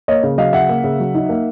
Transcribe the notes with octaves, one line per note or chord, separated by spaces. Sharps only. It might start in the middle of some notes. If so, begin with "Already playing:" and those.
A#3 C#5 D#5
C#3
F#3 D#5 F5
C#3 E5 F#5
A#3
C#3
F#3
D#4
A#3